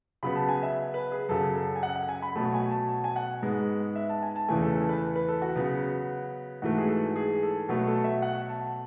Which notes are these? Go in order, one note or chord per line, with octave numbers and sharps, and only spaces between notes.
C#3 F#3 B3 B5
A5
G#5
E5
B4
G#4
F#2 C#3 F#3 A4
A4
G#5
F#5
F#5
G#5
B5
B2 F#3 A3 A5
G#5
A5
A5
G#5
F#5
G#2 G#3 B3
E5
A5
G#5
A5
E2 C#3 E3 A3 G#5
A4
A4
B4
B4
A4
F#4
C#3 F#3 B3
G#2 E3 A3 F#4
G#4
A4
G#4
A4
B2 F#3 A3 B4
A4
E5
F#5
A5